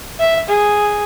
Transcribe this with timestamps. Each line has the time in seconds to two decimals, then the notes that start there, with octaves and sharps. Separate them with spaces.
0.20 E5
0.49 G#4